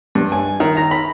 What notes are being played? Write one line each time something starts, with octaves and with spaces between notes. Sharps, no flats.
G2
G#5
D#3
A#5
B5